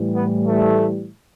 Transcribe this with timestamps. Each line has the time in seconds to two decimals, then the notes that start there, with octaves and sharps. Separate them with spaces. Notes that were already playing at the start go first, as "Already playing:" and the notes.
Already playing: A2 E3 G3
0.15 B3
0.47 A3